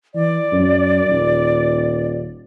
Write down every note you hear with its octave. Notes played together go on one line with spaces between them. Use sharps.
E3 D5
F#2
D#1